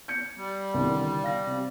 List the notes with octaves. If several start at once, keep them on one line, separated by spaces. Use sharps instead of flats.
G6 G#6 C#7
G3
C2 D3 D#3
F5 A#6
C3